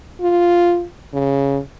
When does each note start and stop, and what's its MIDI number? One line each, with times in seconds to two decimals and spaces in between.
0.21 0.85 65
1.13 1.58 49